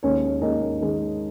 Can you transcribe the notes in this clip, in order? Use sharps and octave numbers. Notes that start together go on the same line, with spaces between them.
D#2 D#3 G#3 C#4 G#4 C#5
D#2 D#3 G#3 C#4 A#4 D#5
D#3 G#3